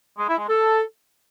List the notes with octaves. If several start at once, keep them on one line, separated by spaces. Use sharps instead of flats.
G#3
E4
G#3
A4